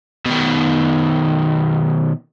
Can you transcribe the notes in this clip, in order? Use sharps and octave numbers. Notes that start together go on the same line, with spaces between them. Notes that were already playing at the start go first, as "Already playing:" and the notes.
B2 D#3